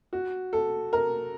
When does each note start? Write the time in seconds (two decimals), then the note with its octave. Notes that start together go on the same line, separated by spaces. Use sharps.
0.13 F#4
0.53 A4
0.93 A#4